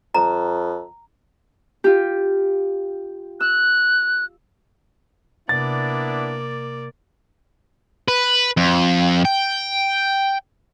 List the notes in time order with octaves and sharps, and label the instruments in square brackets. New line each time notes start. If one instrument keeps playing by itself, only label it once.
[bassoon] F2 [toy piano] A#5
[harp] F4 G4
[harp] E6 [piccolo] F#6
[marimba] C3 [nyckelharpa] A#3 D5 [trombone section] B3 D4 E4 [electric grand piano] A6
[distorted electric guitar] B4
F2
G5